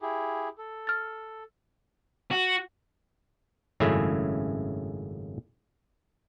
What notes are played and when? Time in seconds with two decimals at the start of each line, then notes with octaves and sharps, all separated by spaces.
0.01 E4 G4 G#4
0.58 A4
0.87 F6 A6
2.31 F#4
3.80 G#1 F#2 C#3 A3 E4 G#4